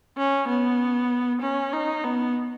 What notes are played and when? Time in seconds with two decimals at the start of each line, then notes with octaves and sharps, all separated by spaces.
0.18 C#4
0.48 B3
1.42 C#4
1.73 D#4
2.04 B3